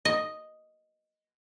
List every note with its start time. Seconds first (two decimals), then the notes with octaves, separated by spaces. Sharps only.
0.05 D#5